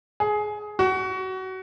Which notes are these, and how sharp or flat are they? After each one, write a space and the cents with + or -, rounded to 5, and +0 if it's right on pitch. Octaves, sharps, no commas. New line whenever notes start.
G#4 +15
F#4 +25